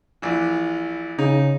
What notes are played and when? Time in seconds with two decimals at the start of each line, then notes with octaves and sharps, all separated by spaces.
0.22 A#1 E3
1.19 C#3 D#4